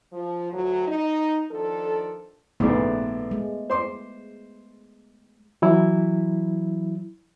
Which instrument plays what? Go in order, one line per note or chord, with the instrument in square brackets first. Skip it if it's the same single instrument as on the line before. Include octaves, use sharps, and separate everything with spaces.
[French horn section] F3
D2 F#3
D#4
D#3 F3 D4 A4
[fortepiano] A#1 G#2 C#3 [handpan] A3 B3 D5
[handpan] G#3
[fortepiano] C5 C6 D6
[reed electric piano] E3 F#3 E4